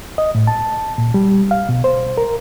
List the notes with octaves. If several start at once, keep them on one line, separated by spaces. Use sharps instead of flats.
D#5
A2
A5
A#2
G3
F5
B2
C5
A#4